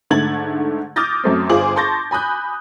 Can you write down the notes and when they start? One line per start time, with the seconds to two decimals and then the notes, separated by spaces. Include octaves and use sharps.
0.10 G#2 D3 A3 G#6 A6 F#7
0.96 D6 D#6 F6 G6 A6 A#6
1.24 F#2 A3 C4
1.49 G1 F4 G#4 C5 D6 F#7
1.76 A5 C6 C#6 G6 A6 A#6
2.11 G#5 B5 D#6 F#6 G6